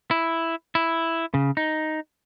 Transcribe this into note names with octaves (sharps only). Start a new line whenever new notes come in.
E4
E4
C#3
D#4